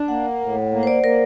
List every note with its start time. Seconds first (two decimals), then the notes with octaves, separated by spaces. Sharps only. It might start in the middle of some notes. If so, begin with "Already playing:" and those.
Already playing: D4
0.08 A#3 F#5
0.41 A2
0.72 A#3
0.83 C5
0.87 D5
1.03 A#3 A#4